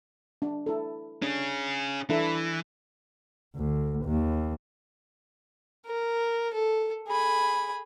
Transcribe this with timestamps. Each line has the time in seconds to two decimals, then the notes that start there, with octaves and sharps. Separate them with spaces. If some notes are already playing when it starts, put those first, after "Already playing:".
0.42 D4
0.66 E4 A4
1.22 C#4 D4 G#4
2.09 E3 D4 E4 A4
3.56 D2
4.05 D#2
5.86 A#4
6.54 A4
7.08 G#4 B5